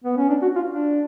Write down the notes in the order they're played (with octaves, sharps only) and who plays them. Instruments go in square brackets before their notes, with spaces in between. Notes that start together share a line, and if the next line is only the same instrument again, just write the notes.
[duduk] B3
C#4
D4
F#4
F4
D4